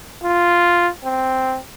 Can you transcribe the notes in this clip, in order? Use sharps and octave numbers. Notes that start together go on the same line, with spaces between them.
F4
C4